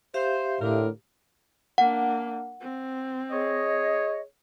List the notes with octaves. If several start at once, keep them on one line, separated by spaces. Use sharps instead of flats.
G4 C5 E5 F5
A2 D3 A#4
A#3 D4 F#5
C4
G#4 C#5 D#5